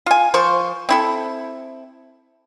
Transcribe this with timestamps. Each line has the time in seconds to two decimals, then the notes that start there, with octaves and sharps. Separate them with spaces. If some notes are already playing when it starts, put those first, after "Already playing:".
0.06 F4 G#5
0.34 F3 C5 C#6
0.89 C4 E4 A4